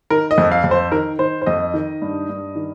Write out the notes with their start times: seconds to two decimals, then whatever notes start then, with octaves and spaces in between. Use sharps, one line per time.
0.10 D#3 A#4
0.31 D#5
0.38 F2
0.52 F5
0.64 F2
0.71 C5
0.92 D#3 A#4
1.19 D#3 C5
1.42 C5
1.46 F2 D#5
1.74 D#3
2.02 G2
2.29 G2
2.55 D#3